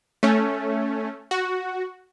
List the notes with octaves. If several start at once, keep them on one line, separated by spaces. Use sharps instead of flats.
A3 C#4
F#4